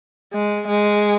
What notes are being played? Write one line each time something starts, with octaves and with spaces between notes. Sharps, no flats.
G#3
G#3